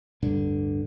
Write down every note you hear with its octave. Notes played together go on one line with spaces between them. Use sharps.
D1 G2 D3